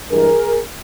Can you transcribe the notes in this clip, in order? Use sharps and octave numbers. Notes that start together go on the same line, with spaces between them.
G2 E3 G#3 G#4 A#4